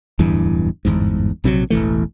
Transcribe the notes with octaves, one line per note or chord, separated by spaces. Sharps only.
D1 E2 G2 E3
G1 E2 G#2
A#1 C3 E3 F#3
E1 A1 E3 A3